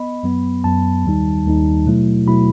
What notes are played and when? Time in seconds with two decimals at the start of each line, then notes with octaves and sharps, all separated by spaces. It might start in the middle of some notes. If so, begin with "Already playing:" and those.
Already playing: B3 D#5 B5
0.23 F#2 F#3 B3
0.64 F#2 F#3 B3 A5
1.05 D#2 D#3 G3 D#4
1.46 D#2 D#3 G3 D#4
1.86 B2 F#3 A3 E4
2.27 B2 F#3 A3 E4 B5